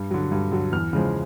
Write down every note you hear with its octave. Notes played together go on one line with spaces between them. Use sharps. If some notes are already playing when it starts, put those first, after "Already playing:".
Already playing: G2
D3 F#3
G2
D3 F#3
E2 F6
C#3 F3 G#3